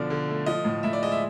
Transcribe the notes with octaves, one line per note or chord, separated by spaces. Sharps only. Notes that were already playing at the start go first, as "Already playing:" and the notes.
Already playing: B2 D3 F3 D5
D3
A3
F3 D#5
A2
A2 E5
D5
G#3 D#5
E5